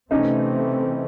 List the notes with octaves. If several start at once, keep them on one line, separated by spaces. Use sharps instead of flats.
C3 E3 A3 C4 C#4 D#4